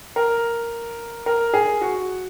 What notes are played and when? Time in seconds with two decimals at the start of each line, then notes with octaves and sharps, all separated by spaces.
0.16 A#4
1.26 A#4
1.53 G#4
1.81 F#4